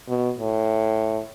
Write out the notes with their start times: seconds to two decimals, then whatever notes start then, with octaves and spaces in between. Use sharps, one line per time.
0.09 B2
0.38 A2